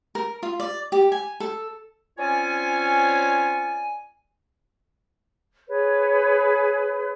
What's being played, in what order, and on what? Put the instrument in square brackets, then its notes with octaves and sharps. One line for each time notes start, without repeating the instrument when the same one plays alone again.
[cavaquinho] A#4
F4
D5
G4
G#5
A4
[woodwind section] C4 C#4 F4 C#5 D5 G#5
[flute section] G#4 B4 C#5